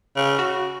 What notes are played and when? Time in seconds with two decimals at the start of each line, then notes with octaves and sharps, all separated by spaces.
0.16 C#3
0.39 F#4